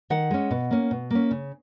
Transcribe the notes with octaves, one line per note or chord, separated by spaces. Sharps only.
D#3 F#5
G#3 C#4
B2
A#3 C#4
B2
A#3 C#4
C#3